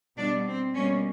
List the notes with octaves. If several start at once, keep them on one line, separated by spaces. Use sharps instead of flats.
B2 G3 B3 D4
C4
B2 G3 A#3 C#4